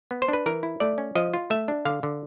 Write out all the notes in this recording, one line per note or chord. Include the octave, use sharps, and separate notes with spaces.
B3
C5
D4 B4
E3 A#4
E4
A3 D5
C#4
F3 D#5
F4
A3 E5
D4
D3 F5
D3